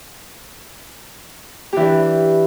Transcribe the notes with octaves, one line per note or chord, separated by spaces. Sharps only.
E3 D4 G4